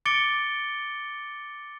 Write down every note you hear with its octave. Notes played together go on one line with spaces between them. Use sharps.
D6 A6 C#7 D7 G7